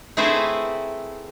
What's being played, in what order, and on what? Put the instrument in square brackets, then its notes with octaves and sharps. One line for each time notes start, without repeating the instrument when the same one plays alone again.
[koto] A3 C4 E4 G#4 B4 C5